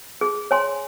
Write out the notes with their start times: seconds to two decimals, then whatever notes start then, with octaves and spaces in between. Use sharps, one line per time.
0.21 G#4
0.51 C#5 G#5 C6